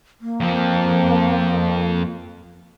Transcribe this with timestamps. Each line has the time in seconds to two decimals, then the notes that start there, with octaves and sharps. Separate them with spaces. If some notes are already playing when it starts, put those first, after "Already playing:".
0.21 A#3
0.40 F2 F3